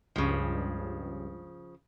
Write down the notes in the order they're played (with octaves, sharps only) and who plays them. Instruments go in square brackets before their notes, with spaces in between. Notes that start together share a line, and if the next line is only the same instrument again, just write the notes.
[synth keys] C#2 G2 [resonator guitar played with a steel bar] C#3 F3